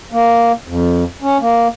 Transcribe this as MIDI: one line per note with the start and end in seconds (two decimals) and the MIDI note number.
0.12 0.52 58
0.67 1.04 41
1.22 1.38 61
1.41 1.68 58